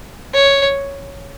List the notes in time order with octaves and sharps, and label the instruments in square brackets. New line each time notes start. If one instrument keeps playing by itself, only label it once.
[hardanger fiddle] C#5